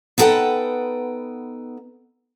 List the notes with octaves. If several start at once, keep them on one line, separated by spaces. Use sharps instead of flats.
B3 D#4 A4 B4 F#5 G5